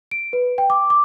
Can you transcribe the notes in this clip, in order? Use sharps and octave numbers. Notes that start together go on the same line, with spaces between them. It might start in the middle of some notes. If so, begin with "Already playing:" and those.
D7
B4
G5
D6
D6